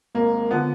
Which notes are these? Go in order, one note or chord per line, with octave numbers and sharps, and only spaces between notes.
G#1 A#3
D3 F3 B3